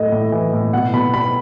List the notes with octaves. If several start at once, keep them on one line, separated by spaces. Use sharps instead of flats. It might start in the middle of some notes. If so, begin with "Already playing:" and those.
Already playing: A2 A3 D#5
A2
E3
A2
B2 F#5
B2 B5
B2 B5